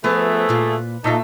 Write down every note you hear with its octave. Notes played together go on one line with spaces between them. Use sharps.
F3 A3 B3 G#4 A4 B4 E5
A#2 F4
A#2 A3 D#4 F4 A4 E5 A#5